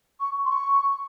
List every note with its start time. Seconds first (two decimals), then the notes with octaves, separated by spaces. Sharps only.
0.20 C#6
0.45 C6
0.51 C#6